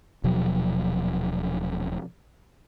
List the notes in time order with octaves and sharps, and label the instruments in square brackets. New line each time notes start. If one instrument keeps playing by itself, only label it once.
[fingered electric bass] D#1 B2 F3 F#3